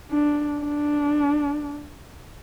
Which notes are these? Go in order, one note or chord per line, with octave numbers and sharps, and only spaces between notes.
D4
D4